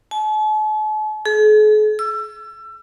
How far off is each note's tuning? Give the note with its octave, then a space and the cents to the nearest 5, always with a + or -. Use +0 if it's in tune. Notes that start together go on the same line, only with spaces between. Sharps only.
A5 -45
G#4 +45
E6 +30